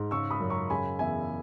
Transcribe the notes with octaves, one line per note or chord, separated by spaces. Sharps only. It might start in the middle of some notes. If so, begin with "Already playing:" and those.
Already playing: G#2
C#3 C#6 E6
B5 D#6
F#2
A#5 C#6
C#3 G#5 B5
E2 E5 G#5